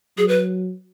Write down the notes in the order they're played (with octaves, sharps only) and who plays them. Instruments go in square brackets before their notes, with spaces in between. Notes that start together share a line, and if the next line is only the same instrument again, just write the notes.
[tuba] F#3 [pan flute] G#4
[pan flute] B4